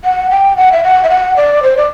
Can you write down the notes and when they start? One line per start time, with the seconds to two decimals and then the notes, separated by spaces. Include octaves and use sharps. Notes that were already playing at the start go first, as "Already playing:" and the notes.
0.04 F#5
0.30 G5
0.57 F#5
0.72 E5
0.84 F#5
1.03 E5
1.10 F#5
1.36 D5
1.63 C5
1.77 D5